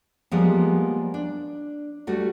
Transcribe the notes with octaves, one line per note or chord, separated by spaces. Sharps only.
F3 G3 G#3 A#3 B3
D4
G3 A3 F#4